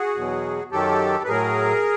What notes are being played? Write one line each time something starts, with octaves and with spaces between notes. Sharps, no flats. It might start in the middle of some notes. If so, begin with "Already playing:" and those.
Already playing: F#4 G#4
E2 B2 F#3
F#2 D#3 F#3 G4 A4
B4
A2 F#3 G#4 A#4